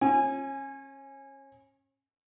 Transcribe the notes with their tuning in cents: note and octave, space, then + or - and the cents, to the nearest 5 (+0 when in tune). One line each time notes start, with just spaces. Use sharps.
C#4 -35 G#5 +0